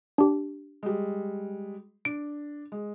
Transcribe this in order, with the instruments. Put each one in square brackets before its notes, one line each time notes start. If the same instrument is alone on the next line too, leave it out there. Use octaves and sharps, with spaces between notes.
[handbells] D4 G4
[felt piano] G3 G#3
[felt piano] D4 [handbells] D7
[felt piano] G#3